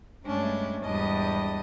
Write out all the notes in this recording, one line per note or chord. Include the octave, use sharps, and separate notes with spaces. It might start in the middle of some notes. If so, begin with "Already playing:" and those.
G2 G#3 A3 C#4 D4
E2 G#2 G3 D4 D#5 D#6